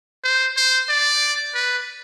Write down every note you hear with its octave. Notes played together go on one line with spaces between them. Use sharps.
C5
C5
D5
B4